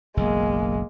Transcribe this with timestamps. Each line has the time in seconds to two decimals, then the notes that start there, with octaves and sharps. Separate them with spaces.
0.17 F#1 B1 G#3 A#3